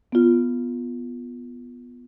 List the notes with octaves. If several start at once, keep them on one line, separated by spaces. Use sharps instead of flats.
B3 F4